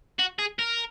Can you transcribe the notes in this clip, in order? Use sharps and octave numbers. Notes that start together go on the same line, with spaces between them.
F#4
G#4
A#4